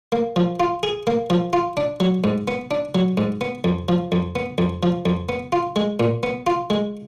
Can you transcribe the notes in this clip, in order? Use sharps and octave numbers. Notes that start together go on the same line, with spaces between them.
A#3
F3
F4
G#4
A#3
F3
F4
D4
F#3
G#2
B3
D4
F#3
G#2
B3
F2
F3
F2
B3
F2
F3
F2
B3
F4
G#3
A#2
B3
F4
G#3